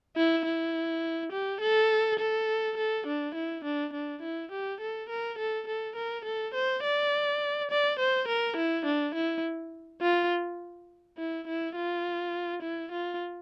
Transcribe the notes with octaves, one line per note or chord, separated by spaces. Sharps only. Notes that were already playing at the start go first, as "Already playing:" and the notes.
E4
E4
G4
A4
A4
A4
D4
E4
D4
D4
E4
G4
A4
A#4
A4
A4
A#4
A4
C5
D5
D5
C5
A#4
E4
D4
E4
F4
E4
E4
F4
E4
F4